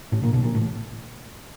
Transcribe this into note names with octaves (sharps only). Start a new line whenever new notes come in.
A1 A2
A#1 A#2
B1 B2
A#1 A#2
A1 A2